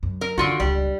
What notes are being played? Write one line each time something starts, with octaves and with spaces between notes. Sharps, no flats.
F#2
A#4
D3 D#3 F4 F#4
D#1 C#2 G3